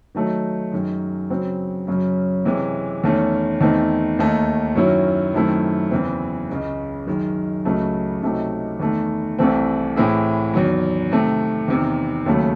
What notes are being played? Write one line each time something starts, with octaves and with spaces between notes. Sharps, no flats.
D#3 F#3 A3 D#4
F#2 D#3 G#3
C#3 F#3 C4
F#2 C#3 F#3 C#4
C3 E3 G#3 C#4
E2 D#3 A3 C#4
E2 D#3 A3 C4 D#4
D#2 D#3 A3 D#4
F#2 D#3 F#3 C#4 E4
F#2 D#3 A3 C4 E4
E2 C#3 E3 C4
C#2 C#3 G#3
F#2 D#3 G#3
C#2 C#3 F#3 A3
C#2 C3 F#3 A3 D#4
E2 D#3 A3
C2 C3 E3 A3 C4
A2 E3 C4 E4 G#4
E2 D#3 F#3
C3 D#3 A3
E2 C3 D#3
D#2 C#3 F#3 A3